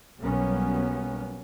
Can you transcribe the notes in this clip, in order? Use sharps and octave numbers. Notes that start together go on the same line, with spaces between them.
B1 F#3 G3 A#3 B3 C#4